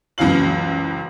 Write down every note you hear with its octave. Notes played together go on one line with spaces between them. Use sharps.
F#1 C#2 E3 F#3 F5 F#7